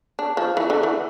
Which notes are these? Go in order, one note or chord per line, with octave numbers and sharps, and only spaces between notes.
D4
F3
E3
D3
E3